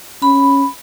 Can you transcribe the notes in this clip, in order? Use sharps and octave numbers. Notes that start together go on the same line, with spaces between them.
C#4 B5